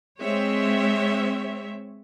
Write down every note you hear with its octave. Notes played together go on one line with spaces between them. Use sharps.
G#3 C4 C#5 E5